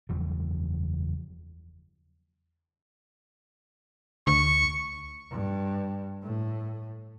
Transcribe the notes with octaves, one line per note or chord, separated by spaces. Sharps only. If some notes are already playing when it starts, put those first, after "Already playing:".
F#1 E2 F3 G3
D2 C#6
G2
A2